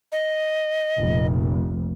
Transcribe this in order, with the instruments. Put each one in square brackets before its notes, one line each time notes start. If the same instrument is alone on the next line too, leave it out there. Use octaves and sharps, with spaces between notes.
[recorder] D#5
[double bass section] F1 A#1